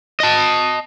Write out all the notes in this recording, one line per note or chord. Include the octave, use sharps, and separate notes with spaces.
D#5 A5